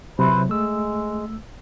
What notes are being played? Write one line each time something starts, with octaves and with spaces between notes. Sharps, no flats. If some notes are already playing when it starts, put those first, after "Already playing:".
C3 F#3 E4 B4 C5
G#3 A3 E6